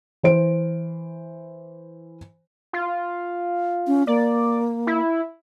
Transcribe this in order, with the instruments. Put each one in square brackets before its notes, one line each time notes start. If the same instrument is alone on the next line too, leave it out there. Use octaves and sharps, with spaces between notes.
[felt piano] E3 C5 D7
[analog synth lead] F4
[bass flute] C#4
[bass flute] A#3 [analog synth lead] D5
[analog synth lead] E4